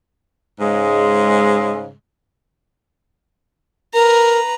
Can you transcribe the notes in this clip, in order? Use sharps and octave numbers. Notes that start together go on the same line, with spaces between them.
G#2 C#3 G#3
A#4 B4 A#5